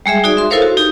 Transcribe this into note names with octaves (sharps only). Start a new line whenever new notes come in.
G3 G#3 G#4 E5
D#4 F#4 G#4 D5
E5 C6
E4 A4 A#4 C5 C#5 F5
F#4
D#4 G4